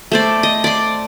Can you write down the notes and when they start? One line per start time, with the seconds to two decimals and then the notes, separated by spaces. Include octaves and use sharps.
0.12 A3 C5 D5
0.43 D#5
0.64 D5 C6